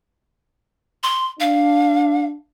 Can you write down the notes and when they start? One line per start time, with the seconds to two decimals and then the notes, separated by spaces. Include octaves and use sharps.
1.03 C6
1.40 D4 F5